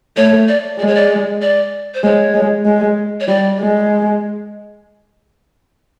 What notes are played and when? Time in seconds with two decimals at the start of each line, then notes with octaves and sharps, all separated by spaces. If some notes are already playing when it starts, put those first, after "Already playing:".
0.16 A3 C#5
0.48 D5
0.79 G#3 D5
0.87 C#5
0.94 D5
1.41 D5
1.94 C5
2.03 G#3 C#5
2.34 G#3
2.65 G#3
3.20 C#5
3.27 G3 D5
3.59 G#3